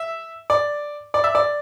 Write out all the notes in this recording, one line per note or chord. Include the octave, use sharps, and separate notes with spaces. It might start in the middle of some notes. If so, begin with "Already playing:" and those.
Already playing: E5
D5
D5
E5
D5